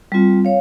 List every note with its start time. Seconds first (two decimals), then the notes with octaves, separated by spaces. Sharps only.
0.12 G3 C4 F4
0.45 C#5 F5